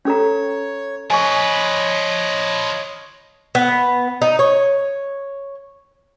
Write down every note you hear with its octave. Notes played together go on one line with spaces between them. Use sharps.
C#4 A4 C#5 A#5
F3 B4 C#5 D#5 G#5 C#6
B3
D#4
C#5